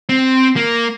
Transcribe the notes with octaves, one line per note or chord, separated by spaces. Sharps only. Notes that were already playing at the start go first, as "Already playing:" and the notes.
C4
A#3